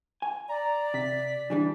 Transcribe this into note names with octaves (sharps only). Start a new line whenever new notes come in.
G#5
D5 A#5
C3 B6
C#3 E3 G3 D4